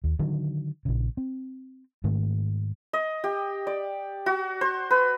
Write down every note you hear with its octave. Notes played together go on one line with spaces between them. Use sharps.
D#2
D3 D#3 F#3
A#1 C#3
C4
G#2 D#3 A3
D#5
G4
D5
F#4
C5
B4